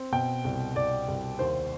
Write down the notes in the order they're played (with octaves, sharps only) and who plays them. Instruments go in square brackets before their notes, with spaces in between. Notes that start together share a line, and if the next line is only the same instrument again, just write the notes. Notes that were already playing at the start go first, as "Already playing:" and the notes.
Already playing: [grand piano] C4
B2 G5
C2
C2 D5
C2
D#2 C5